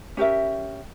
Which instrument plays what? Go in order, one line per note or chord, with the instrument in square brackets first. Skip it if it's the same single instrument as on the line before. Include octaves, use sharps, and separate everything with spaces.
[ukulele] C#4 G4 A#4 E5